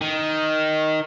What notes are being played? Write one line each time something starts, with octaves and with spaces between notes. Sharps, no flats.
D#3